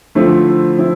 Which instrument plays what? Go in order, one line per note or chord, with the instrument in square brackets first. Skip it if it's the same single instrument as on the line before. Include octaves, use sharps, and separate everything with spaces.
[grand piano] D3 F3 A3 C4 E4
F3 C4 E4